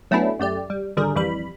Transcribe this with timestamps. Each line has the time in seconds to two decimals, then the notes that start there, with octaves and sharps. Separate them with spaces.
0.11 F#3 A3 B3 C#4 D4 E4
0.39 F#2 A3 G4 D5
0.70 G3
0.97 G#1 D3 G3 G#4 A#4
1.16 F2 E3 G3 B5